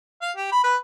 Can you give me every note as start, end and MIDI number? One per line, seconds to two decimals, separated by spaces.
0.22 0.31 77
0.37 0.50 67
0.52 0.63 83
0.63 0.76 71